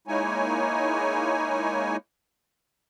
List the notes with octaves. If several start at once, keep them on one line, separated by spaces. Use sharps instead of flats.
G#3 A#3 D#4 E4 C#5 G#5